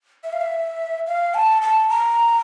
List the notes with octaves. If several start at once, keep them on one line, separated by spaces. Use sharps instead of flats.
E5
F5
E5
F5
A5
A5
A#5